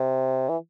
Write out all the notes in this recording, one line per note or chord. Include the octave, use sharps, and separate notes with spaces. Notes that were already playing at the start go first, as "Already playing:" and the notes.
Already playing: C3
E3